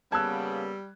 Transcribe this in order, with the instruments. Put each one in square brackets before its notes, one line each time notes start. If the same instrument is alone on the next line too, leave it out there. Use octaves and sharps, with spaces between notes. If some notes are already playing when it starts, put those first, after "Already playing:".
[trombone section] C#3 A#3 B3 [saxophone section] G3 [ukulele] A5 [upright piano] E6 F#6 G#6